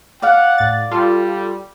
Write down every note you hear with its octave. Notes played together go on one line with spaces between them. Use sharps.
D5 F5 F#5
A2 A6
G3 F4 A4